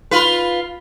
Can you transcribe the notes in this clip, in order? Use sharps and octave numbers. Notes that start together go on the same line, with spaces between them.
F4 B4